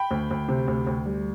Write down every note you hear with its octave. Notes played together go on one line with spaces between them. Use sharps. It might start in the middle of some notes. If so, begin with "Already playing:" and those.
Already playing: G5 B5
D2
D2
C3
D2
D2
G3